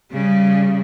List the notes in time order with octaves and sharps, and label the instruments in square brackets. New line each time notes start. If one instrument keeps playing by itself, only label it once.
[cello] C#3 G3